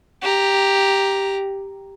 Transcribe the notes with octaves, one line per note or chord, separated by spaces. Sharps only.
G4 A#5